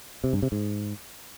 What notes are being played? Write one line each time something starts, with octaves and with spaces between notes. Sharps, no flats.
C3
G2
C3
G#2